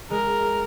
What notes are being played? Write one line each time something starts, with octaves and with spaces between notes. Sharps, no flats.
G#3 A#4